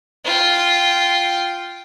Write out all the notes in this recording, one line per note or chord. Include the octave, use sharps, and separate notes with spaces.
F4 G5